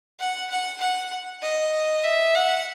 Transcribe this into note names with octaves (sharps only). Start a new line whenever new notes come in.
F#5
F#5
F#5
D#5
E5
F#5